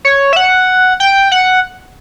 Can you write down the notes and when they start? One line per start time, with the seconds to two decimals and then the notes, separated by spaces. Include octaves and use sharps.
0.05 C#5
0.33 E5
0.36 F#5
1.00 G5
1.32 F#5